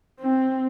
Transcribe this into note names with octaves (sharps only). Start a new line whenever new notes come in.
C4